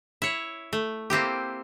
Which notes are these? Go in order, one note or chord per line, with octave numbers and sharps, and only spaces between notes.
E4 C#5
A3
A#3 C4 E4 G4